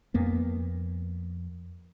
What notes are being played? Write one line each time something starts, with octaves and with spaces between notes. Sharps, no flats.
F2 A#3 B3